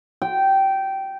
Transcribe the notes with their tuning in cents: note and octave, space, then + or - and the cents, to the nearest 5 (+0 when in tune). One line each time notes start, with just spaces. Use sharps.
G5 -15